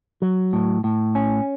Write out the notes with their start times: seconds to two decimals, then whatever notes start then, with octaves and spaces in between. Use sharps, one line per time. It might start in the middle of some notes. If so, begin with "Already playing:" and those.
0.22 F#3
0.53 A2
0.84 A2
1.15 C#4